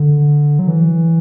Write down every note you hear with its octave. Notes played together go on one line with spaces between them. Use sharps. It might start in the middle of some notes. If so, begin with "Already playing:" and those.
Already playing: D3
F#3
E3